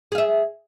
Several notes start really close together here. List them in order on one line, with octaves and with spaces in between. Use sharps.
G#4 F5 E5